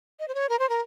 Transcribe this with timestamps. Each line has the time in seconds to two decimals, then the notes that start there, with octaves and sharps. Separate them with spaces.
0.20 D#5
0.28 C5
0.35 C#5
0.49 A#4
0.59 C5
0.69 A#4